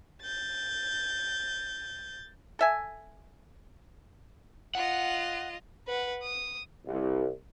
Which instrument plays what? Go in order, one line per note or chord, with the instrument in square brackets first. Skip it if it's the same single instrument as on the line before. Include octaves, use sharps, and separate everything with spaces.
[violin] G6 A6
[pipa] A4 E5 G#5
[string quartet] F4 D#5 [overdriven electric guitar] F#5
[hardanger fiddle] B4 F#5
D#6
[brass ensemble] C2